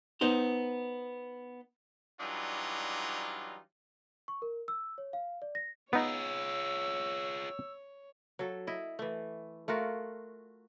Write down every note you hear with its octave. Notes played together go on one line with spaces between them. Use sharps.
B3 D#4 C5
E3 F#3 G3 D4 D#4 F4
C#6
A#4
E6
C#5
F5
D5
A#6
B3 D#4 F4 G#4 C#5 E6
F#3 A4
E4 D#5
E3 A3
A3 F4 F#4 A#4